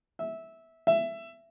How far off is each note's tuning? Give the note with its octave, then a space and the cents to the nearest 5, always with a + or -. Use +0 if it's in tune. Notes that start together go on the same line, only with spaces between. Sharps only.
E5 -15
E5 +15